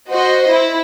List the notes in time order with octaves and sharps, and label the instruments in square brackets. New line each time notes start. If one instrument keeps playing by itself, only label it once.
[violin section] F#4 C5 D#5
E4